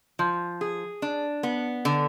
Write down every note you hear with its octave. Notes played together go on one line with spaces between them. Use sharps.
F3
G#4
D4
B3
D3